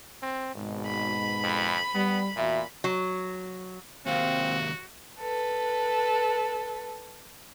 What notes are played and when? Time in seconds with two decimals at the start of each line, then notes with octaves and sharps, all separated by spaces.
0.22 C4
0.55 G#1 G#2 B2
0.86 B5
1.43 F2
1.95 G3 B3
2.36 E2 A#2 F#4 E5
2.84 F#3
4.06 D#2 C3 C4 F#4 F5
5.19 A4 B4